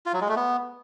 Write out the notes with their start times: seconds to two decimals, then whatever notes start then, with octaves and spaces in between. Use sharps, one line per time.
0.06 F4
0.14 F#3
0.21 G#3
0.29 A3
0.36 B3